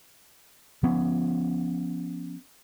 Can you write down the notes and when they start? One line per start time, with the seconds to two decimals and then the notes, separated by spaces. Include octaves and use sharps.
0.83 F3 B3 C#4